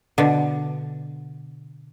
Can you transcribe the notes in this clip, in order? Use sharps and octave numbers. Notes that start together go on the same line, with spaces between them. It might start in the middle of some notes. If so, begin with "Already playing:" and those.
B2 D3